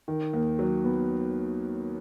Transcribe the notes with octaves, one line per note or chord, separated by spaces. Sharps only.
D#3
D#2
F#3
B3